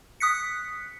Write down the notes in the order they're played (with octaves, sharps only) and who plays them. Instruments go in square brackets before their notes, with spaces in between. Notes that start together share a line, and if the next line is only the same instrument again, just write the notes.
[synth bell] D#6 F#6 B6 C#7